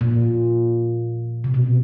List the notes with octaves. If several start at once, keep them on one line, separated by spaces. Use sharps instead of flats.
A#2
C3
B2